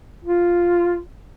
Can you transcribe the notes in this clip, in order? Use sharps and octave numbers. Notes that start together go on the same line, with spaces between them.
F4